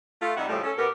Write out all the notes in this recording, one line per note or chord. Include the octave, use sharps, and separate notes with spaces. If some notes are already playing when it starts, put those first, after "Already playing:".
A3 F4
C3 G3 D#4 E5 F#5
A2 C#3 F3 G3 A3
C#4 A4
B2 B3 G4 A#4